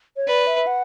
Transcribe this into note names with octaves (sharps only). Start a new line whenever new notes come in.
C#5
B4 D5
E5
F#5